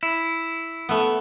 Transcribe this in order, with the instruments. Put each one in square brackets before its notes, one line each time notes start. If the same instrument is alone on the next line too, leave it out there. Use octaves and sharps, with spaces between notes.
[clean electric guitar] E4
[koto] A3 B3